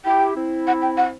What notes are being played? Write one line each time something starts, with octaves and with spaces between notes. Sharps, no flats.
E4 G4 G5
C4 E4
F#5
G5
F#5